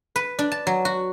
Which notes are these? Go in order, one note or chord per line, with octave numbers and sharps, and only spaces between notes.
B4
D4
A5
F#3
F#4